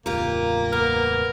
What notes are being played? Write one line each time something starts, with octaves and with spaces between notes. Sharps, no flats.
E1 C#2 A#3 F4 G4 A#4
B3 A#4